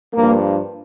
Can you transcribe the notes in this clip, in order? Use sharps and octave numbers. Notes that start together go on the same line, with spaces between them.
G2 F3 A#3